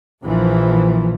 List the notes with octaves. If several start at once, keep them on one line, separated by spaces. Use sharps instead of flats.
A#1 E3 F3